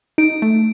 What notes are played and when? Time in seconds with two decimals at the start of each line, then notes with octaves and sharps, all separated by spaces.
0.18 D#4 D7
0.42 A3